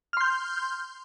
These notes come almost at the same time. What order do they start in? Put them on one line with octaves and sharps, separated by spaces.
F6 C6 G6